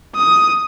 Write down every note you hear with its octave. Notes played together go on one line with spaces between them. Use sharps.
D#6